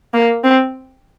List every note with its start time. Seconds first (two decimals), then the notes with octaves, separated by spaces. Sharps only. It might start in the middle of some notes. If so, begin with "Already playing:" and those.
0.14 A#3
0.44 C4